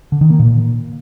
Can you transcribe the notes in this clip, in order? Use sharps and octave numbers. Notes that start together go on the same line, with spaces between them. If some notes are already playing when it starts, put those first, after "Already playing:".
D3
D#3
A#3
A#2